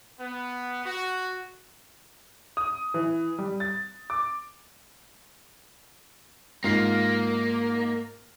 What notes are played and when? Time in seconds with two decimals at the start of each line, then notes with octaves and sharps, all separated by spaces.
0.19 B3
0.85 F#4
2.57 D#6
2.94 E3
3.39 G3
3.60 A6
4.10 D6
6.64 G#2 A#3 F4 C7